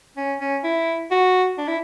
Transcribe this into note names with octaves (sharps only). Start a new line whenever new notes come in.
C#4
C#4
E4
F#4
D4
E4